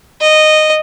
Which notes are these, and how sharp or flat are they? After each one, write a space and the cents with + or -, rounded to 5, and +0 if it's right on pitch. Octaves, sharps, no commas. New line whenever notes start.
D#5 -10